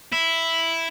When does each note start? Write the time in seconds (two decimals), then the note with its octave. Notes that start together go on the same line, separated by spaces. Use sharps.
0.12 E4